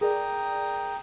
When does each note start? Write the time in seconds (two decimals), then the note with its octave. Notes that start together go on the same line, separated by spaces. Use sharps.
0.01 G#4 A#4 D5 G5 A#5 D#6